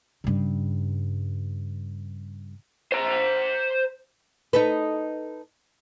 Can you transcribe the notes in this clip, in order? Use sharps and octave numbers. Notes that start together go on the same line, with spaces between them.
G2 C#3
C5 A#5
D#4 A4 B4